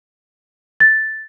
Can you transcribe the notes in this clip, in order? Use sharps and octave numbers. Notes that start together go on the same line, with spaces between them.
A6